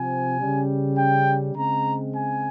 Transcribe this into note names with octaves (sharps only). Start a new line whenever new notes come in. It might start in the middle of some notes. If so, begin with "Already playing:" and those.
Already playing: C3 F3 C4 G#5
C#3 G3 C#4
G5
C#3 G#3 C4 A#5
G#5